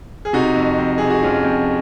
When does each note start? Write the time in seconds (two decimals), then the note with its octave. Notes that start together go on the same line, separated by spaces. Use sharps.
0.25 G#4
0.33 C3 D#4 F#4
0.56 F2
0.78 F2
0.98 C3 G#4
1.10 F#4
1.23 F2 C#4 F4
1.44 F2